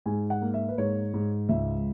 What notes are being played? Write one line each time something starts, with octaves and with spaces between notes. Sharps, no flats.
G#2 G#5
F#5
A#3
E5
B4
G#2 C#5
G#2
C#2 E5